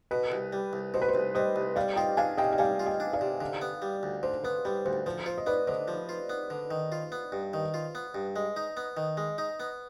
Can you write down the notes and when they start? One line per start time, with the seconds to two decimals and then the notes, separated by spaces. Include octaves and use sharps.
0.11 B2 B4
0.32 C2
0.53 G3
0.73 C2
0.94 B2 C5
1.02 B4
1.08 C5
1.15 C2
1.35 G3 C5 D#5
1.56 C2
1.76 G3 D5 F5
1.96 F4 D#5 G5
2.17 D4 F5 G#5
2.37 C3 D#5 G5
2.53 G5
2.58 G3 F5 G#5
2.80 F4
2.86 D#5 G5
3.00 D4
3.13 D5 F5
3.21 C3
3.41 D3
3.61 B3
3.82 G3
4.03 D2
4.23 D3 C5
4.44 B3 B4
4.65 G3 B4
4.85 D2 C5
5.06 F3 C5
5.26 F4 C5
5.38 D#5
5.46 B3 B4 D5
5.67 D3 C5 D#5
5.88 F3
6.09 F4
6.29 B3
6.50 D3
6.71 D#3
6.92 F4
7.12 B3
7.32 G2
7.53 D#3
7.74 F4
7.95 B3
8.15 G2
8.36 G#3
8.56 D#4
8.77 B3
8.97 D#3
9.17 G#3
9.38 D#4
9.60 B3